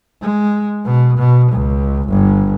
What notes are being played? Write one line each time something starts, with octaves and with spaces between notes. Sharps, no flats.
G#3
B2
B2
C#2
G1